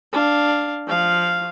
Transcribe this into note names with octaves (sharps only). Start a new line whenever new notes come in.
D4 F5
F3 F5